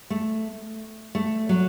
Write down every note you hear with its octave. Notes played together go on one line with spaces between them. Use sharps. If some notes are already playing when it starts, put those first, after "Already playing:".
A3
A3
F#3